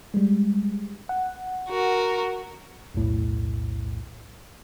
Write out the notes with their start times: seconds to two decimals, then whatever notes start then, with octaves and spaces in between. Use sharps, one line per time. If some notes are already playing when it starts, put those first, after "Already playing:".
0.14 G3 G#3
1.09 F#5
1.69 F#4 A#4
2.95 B1 E2 A2